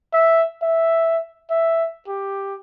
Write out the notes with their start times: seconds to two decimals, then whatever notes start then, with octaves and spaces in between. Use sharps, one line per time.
0.13 E5
0.62 E5
1.51 E5
2.08 G4